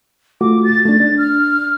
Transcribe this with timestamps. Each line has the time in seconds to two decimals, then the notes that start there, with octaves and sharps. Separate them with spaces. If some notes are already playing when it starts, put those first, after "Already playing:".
0.41 A3 F4 F#4 D6
0.64 A6
0.86 A3 D4 A6
1.00 D4
1.18 F6